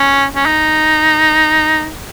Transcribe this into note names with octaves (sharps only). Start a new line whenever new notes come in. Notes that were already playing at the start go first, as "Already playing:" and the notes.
Already playing: C#4
C#4
D#4